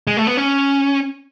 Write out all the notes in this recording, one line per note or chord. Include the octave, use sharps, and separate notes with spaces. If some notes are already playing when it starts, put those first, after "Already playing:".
G#3
A3
B3
C#4